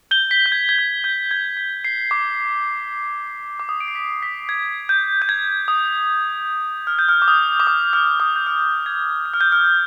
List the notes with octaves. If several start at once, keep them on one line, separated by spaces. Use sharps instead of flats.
G6 G7
B6
G6
G#6
G#6
G6
G6
G#6
B6
C7
D6
D6
D#6
D7
C7
B6
B6
G#6
G6
G6
G#6
D#6
F6
G6
F6
D6
D#6
D6
D#6
F6
D#6
G6
F6
G#6
G6
F6
G6
F6